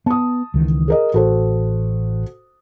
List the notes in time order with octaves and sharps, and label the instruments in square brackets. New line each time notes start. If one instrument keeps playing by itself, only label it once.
[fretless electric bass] B3 [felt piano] A5 D#6
[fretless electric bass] C#2 D#3 E3
[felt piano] G#4 A#4 D#5
[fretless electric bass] A1 [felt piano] F#4 A4 C5